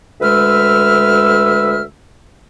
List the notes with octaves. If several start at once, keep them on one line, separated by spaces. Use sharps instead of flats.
D2 G#3 B4 E5 E6 F6